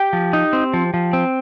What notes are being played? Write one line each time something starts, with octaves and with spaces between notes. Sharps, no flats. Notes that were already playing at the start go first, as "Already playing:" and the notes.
Already playing: G4 G5
F3
D#4
C4
F3
F3
C4